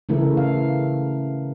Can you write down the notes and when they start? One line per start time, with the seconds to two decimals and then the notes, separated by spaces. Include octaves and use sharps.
0.09 C#3 E3 A3 E4 A#4
0.37 F5